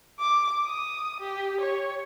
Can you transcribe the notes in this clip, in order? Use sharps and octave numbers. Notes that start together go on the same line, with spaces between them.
D6
D#6
G4
C#5